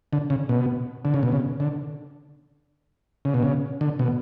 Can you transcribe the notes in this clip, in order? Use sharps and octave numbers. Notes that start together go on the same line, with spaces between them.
D3
C#3
B2
D3
C#3
B2
C#3
D3
C#3
B2
C#3
D3
B2